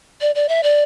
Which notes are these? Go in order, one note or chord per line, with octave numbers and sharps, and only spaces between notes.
D5
D5
E5
D5